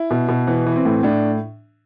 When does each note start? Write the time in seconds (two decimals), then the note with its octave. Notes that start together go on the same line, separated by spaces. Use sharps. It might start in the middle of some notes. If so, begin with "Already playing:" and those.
Already playing: E4
0.11 B2
0.28 B2
0.47 E3 B3
0.66 E3
0.76 C4
0.85 A2
1.03 A2 D4